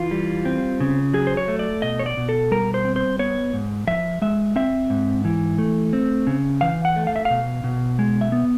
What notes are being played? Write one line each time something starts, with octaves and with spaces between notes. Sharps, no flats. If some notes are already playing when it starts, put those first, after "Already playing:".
Already playing: E3 F4
G3
C4
C#3
F#3 G#4
C5
C#5
A3
D5
B2 D#5
C#5
D5
B2
A4
G3 A#4
C5
C4
C5
B3 C#5
G#2
F3 E5
G#3 E5
C4 E5
G#2
E3
A3
C4
C#3
E3 F5
F#5
A3
F5
E5
F5
B2
B2
G#3
E5
B3